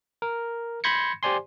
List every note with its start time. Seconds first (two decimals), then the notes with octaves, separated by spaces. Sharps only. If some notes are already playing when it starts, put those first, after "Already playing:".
0.22 A#4
0.84 B5 C6 G6 G#6 A#6 C#7
1.23 G4 C5 D5 G#5 C6